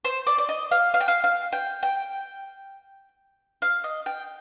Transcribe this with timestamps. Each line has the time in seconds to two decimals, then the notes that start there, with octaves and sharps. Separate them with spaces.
0.05 C5
0.27 D5
0.38 D5
0.49 D#5
0.71 F5
0.94 F5
1.00 G5
1.08 F5
1.24 F5
1.52 G5
1.83 G5
3.62 F5
3.84 D#5
4.06 G5